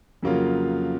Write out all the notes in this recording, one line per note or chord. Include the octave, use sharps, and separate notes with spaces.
F2 C#3 F#3 A#3 F4